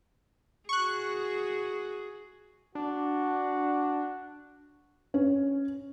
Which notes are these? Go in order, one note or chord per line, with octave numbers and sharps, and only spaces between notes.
F#4 G#4 C#6 F#6
D4 F#4
C#4